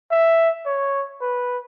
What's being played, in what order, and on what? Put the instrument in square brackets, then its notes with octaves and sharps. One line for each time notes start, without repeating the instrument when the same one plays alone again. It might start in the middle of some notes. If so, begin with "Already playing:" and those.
[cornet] E5
C#5
B4